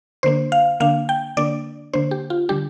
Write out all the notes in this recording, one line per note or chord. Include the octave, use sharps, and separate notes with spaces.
D3 A#3 D4 C5
F5
D3 A#3 D4 F5
G5
D3 A#3 D4 D5
D3 A#3 D4 C5
G4
F4
D3 G3 D4 G4